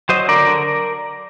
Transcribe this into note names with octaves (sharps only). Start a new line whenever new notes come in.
F#3 C5 D#5
D3 A#4 D5
D3